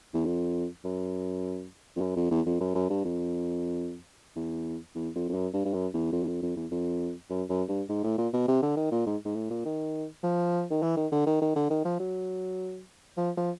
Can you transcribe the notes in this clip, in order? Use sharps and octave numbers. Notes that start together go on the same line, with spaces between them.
E2
F2
F#2
F2
F#2
F2
E2
F2
F#2
F#2
G2
F2
E2
E2
F2
F2
F#2
G2
G2
F#2
E2
F2
E2
F2
F2
E2
F2
F#2
F#2
G2
G#2
A2
A#2
B2
C3
D3
D#3
A#2
G#2
G#2
A2
A#2
D#3
F3
D#3
E3
D#3
D3
D#3
D#3
D3
D#3
F3
F#3
F3
F3